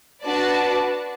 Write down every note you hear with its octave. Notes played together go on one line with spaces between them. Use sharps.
D4 F#4 B4 D5 A5